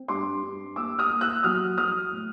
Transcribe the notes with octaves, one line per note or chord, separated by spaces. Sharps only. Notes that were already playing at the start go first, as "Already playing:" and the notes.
Already playing: C4
G2 C6 D6
G2
A#3 D6 E6
D#6 F6
A#3
E6 F#6
F#3 D#6 F6
F#3 D#6 F6
A2